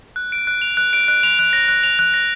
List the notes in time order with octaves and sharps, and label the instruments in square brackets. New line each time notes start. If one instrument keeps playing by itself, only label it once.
[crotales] F#6
D7
F#6
F7
F#6
D7
F#6
F7
F#6
A#6
F#6
F7
F#6
A#6